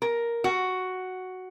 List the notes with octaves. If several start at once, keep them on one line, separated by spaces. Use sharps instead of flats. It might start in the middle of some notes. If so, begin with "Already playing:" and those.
A#4
F#4